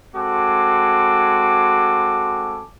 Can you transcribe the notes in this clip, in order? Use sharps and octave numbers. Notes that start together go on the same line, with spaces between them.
G#3 C4 F#4 A4 G#5 D6